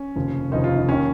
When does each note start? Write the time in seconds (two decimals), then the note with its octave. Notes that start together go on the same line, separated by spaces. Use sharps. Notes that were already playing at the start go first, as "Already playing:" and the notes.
Already playing: C#4
0.16 F1 D#2 C#3 F3
0.52 F1 D#2 C#3 F3 D#4
0.64 F4
0.76 D#4
0.88 D#2 D#3 C#4